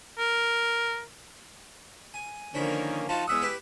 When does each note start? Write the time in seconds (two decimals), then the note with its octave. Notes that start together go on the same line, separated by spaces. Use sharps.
0.18 A#4
2.14 G#5
2.54 D3 D#3 F3 A#3 C#4 E4
3.09 F3 D#4 F4 F#4 A5
3.27 E2 G#3 E5 F#5 D#6 E6
3.42 E4 G4 B4